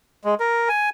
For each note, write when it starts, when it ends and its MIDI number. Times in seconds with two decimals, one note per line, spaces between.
0.24 0.35 56
0.40 0.69 70
0.69 0.90 80